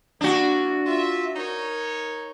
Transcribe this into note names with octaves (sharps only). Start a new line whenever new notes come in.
A#3 D4 E4 F#4
F4 E5
D#4 A#4 C#5